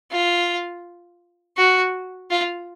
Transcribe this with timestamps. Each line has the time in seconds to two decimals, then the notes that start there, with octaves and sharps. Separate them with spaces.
0.12 F4
1.58 F#4
2.31 F4